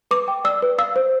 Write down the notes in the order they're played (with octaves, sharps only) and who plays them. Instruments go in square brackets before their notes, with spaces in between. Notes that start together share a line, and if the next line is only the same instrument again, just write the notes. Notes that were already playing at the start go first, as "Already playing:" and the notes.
[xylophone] B4 D6
G5
D5 E6
B4
F5 E6
C5